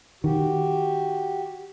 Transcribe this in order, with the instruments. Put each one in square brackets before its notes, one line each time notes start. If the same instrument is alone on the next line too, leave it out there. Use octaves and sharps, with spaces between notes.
[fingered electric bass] D#3 [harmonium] F#4 G4